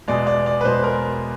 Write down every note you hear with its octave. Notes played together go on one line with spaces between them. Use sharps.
E2 B2 G#3 D5
D5
D5
B4
E2 B2 G#3 C5
A#4